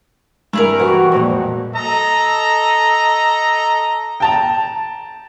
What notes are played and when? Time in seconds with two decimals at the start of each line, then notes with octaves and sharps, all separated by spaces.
0.53 G2 E4 G#4 A#4
0.79 E3 F#4 G4 F#5
1.12 F2 A#2 G#3
1.75 A4 D#5 A#5
4.20 G5 A5 A#5